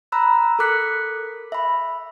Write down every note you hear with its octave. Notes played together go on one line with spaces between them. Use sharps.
A#5 B5 E6 F#6
A4 A#4 D6 F#6 B6 C#7
E5 B5